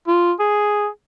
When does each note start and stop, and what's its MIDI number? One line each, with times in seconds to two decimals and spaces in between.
0.08 0.32 65
0.40 0.88 68